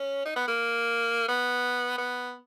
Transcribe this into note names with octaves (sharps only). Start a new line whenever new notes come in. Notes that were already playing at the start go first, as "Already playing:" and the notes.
Already playing: C#4
D#4
B3
A#3
B3
B3